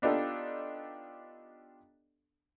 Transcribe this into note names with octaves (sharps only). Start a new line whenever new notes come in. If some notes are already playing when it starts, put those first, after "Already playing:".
B3 D4 D#4 F4 G4 A4